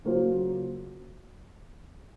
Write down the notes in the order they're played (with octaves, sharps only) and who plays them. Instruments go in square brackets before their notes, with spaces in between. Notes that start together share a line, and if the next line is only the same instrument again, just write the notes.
[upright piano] C#3 F#3 A#3 F4 C5